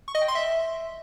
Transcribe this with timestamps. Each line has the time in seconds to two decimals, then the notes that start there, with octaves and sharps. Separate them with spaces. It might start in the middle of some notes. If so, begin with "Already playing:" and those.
0.08 C#6
0.15 D#5
0.21 G5
0.28 C6
0.35 E5